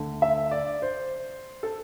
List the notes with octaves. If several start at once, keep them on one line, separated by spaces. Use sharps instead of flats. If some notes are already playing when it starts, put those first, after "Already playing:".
Already playing: D2 D3 A3
E5
D5
C5
A4